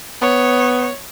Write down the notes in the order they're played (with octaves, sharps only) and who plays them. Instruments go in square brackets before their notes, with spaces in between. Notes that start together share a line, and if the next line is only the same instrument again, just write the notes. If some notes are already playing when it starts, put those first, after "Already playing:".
[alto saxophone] B3 [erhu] C#5